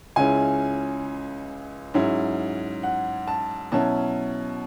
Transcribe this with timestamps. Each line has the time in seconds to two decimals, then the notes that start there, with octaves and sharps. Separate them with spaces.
0.16 C#2 C#3 G#3 C#4 E4 G#5
1.94 G#2 F#3 C#4 E4
2.83 F#5
3.27 A5
3.72 B2 F#3 C#4 E4 A5